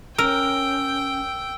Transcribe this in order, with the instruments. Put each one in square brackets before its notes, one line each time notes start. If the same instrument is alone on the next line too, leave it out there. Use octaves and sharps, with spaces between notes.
[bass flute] C#4 [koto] A#4 [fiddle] G5 [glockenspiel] E6